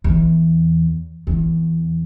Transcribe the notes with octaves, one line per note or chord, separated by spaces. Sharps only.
E2
E2